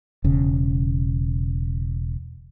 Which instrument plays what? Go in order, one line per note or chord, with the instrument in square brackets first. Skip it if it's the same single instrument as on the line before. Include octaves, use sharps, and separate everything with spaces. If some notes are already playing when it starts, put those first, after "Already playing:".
[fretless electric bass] E1 C#3